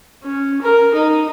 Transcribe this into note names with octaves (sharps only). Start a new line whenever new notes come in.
C#4
A#4
D#4